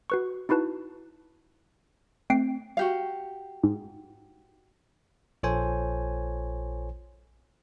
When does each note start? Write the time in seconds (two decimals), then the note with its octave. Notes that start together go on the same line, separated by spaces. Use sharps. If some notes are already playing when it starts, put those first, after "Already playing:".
0.10 F#4 B4 C#6
0.49 D#4 E4 F#4 B4 A5
2.30 A3 C4 G5 C7 D7
2.77 F#4 G4 F5
3.63 G#2
5.43 A#1 F4 A4 C5 C#5 G#5